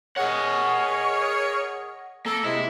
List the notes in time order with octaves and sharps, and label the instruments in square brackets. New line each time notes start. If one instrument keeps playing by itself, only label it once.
[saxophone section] G#4 A#4 C#5 [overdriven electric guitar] D#5 F#5
[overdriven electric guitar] A#3 [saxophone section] A4
[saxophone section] C3 G#3 [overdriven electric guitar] E4